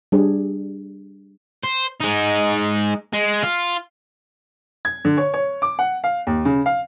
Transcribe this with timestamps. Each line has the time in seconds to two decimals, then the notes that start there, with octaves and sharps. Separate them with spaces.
0.12 G3 D4 G#4
1.63 C5
2.00 G#3 D#4
3.13 G#3
3.43 F4
4.85 G#6
5.05 D3
5.18 C#5
5.34 C#5
5.62 D6
5.79 F#5
6.04 F5
6.27 D#2
6.45 C#3
6.66 F5